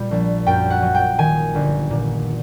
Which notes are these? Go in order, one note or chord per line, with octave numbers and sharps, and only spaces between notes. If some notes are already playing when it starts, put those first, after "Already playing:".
Already playing: A#2 G3
A#1
F#2 G5
F#5
F#3
G5
D#3 G#5
G1
A#2